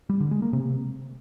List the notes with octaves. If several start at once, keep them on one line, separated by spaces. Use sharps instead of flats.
G3
D3
G#3
A#3
C3